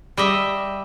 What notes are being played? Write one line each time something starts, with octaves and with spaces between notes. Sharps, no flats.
G3 D#5 E5